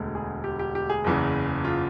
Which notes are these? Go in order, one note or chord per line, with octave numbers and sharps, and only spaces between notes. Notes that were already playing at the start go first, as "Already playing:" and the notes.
Already playing: E1 D2 D3
G#4
G4
G4
G4
G#4
F#1 E2 C#3 E3
F4